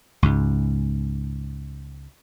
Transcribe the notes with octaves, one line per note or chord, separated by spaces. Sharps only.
C#2 G#2